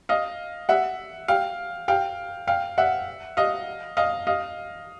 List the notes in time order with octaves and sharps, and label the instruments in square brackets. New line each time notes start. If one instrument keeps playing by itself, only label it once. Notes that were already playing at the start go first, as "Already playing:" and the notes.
[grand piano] D#5 F5
E5 F#5
F5 G5
F5 G5
F5 G5
E5 F#5
D#5 F5
D#5 F5
D#5 F5